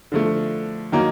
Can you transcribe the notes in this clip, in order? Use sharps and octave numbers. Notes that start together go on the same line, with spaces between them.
D3 F3 A3
D#3 F#3 A#3 D#4